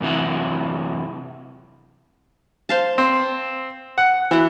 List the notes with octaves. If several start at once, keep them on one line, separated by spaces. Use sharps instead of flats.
F#2 C3 E3 F#4
C5 F5 A5
C4
F#5
E3 F#4 F#5